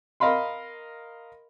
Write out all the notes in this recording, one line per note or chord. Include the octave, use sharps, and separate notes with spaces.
A#4 D#5 F5 B5 C6